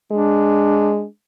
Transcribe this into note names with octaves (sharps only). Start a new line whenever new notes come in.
G#3 D4